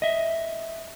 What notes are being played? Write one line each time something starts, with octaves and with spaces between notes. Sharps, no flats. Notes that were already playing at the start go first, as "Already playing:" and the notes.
D#5 E5